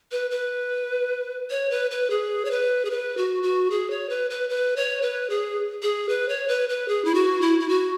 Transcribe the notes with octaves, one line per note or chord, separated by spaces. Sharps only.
B4
B4
C#5
B4
B4
G#4
C#5
B4
G#4
B4
F#4
F#4
G#4
C#5
B4
B4
B4
C#5
B4
G#4
G#4
B4
C#5
B4
B4
G#4
E4
F#4
E4
E4
F#4